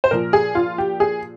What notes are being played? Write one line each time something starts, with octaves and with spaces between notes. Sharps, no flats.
C5
A#2 F3 A#4
G#4
F4
G4
G#4